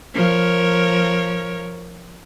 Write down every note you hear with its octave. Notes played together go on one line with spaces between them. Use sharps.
F3 A#4 C#5